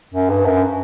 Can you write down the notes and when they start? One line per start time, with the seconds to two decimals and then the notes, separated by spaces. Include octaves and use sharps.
0.14 F#2
0.30 G2
0.45 F#2